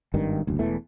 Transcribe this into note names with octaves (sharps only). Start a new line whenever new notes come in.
G#1 G2 D#3
F#1 D2
E1 E2 E3 A3